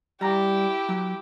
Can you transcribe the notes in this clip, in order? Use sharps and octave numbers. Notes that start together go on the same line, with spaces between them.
G3 E4 G4 A#5
F#3